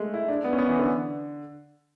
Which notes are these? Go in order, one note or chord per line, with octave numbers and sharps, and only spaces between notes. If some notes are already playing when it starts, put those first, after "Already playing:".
Already playing: G#3 A3
E4
D4
B3
C#4
B3
E3
D3